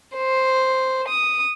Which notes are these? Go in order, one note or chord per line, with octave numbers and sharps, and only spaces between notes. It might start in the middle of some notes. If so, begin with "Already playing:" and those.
C5
D#6